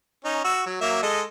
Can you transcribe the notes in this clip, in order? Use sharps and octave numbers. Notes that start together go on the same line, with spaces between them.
C#4 D#4
F#4 E6
F#3
F#3 A#3 E5
G#3 A4 D#5